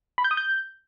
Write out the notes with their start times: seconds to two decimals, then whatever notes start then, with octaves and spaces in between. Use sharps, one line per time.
0.18 B5
0.24 G6
0.31 D#6
0.37 G6